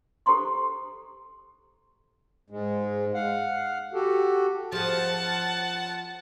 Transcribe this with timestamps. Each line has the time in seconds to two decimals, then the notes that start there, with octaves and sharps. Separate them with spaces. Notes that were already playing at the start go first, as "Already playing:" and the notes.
0.26 G4 A4 C5 A#5 C6 C#6
2.50 G#2 G#3
3.14 F5 F#5
3.94 F#4 G4 A4
4.72 F3 G#4 F#5 A5